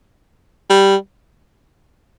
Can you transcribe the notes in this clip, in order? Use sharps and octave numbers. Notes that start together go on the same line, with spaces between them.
G3